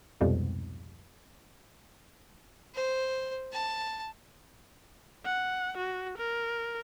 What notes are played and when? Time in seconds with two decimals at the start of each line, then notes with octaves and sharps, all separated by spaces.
0.21 C2 F2 G#2 B2 G3
2.74 C5
3.53 A5
5.25 F#5
5.77 F#4
6.18 A#4